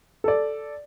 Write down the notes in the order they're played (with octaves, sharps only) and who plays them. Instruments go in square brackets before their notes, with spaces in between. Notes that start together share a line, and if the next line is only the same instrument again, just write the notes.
[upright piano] A4 D5